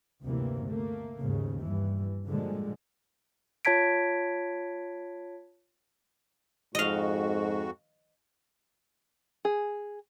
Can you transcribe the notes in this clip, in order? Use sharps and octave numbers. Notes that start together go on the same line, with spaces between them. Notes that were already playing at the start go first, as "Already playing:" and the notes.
D2 G2 C3 E3 A#3
A3 A#3
D#2 G#2 C#3
G2 E3
A#2 D3 F3 G3 G#3
F4 C#5 A5 G#6 B6 D7
F2 G#2 F#4 D#5 F5
G#4